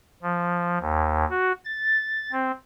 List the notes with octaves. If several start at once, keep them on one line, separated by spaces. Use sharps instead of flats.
F3
D#2
F#4
A6
C4